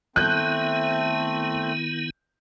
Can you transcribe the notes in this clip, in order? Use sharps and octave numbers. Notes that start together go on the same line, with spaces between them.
D#3 A3 B3 C4 E4 F#6 G6